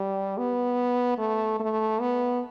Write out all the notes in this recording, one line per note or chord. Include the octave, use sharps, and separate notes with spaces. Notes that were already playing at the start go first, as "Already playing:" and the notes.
Already playing: G3
B3
A3
A3
B3